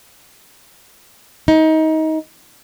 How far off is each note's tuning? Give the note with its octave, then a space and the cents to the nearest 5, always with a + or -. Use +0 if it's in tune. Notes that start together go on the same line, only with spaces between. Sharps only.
D#4 +25